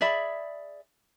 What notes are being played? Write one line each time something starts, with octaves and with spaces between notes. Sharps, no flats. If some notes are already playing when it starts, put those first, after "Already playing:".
G#4 D5 E5 B5